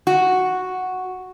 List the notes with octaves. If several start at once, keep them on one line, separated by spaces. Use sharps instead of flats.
F#4